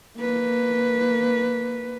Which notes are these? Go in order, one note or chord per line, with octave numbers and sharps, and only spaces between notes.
A#3 B4